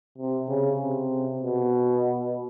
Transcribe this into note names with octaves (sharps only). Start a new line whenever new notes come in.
C3
C#3
C3
B2